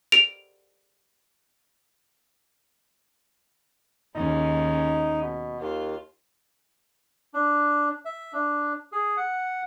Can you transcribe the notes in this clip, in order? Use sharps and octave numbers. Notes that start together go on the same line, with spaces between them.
D7 F7
D#2 G#3 C#4 D#4
B2
D#2 F4
D4
E5
D4
G#4
F#5